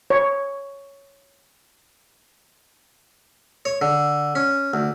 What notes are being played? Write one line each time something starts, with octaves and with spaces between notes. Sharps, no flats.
C#5
C#5
D3
C#4
D2